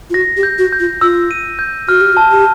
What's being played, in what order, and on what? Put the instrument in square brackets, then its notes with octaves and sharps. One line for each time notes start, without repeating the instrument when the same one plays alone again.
[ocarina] F4
[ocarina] F#4 [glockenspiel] A#6
[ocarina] G4
[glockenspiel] G6
[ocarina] F#4
[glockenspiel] G6
[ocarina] F4
[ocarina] F4 [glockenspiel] E6
[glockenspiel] D#7
G6
[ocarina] F#4 [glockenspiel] F6
[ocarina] G4
F#4
[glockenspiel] A5
[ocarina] G4